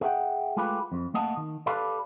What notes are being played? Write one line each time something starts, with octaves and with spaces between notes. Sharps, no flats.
G#4 E5 F#5 G5
G#3 A3 F4 G4 B4
F2
A3 A#3 D#5 F#5 A5
D#3
G4 A4 B4 D5 F5